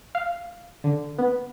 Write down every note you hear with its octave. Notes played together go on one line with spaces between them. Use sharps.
F5
D3
B3